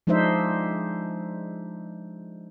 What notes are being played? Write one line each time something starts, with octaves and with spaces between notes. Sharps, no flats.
F3 G#3 D4 D#4 C5 E5